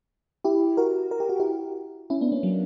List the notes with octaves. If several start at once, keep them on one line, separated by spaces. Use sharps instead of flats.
E4 G4
F#4 A#4
A#4
G4
F#4
E4 G4
C#4 E4
B3 D4
A#3 C#4
F#3 A#3